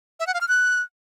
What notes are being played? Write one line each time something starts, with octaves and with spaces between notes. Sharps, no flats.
E5
F#5
F5
F6
F#6